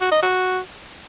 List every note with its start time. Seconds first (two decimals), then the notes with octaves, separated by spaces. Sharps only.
0.01 F#4
0.12 D#5
0.22 F#4